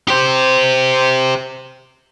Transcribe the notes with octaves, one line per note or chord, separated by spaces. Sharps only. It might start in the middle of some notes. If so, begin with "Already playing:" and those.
G4 C5